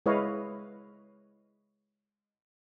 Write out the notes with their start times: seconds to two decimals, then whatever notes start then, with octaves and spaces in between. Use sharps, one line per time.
0.06 G#3 E4 B4 C#5 D#5 F5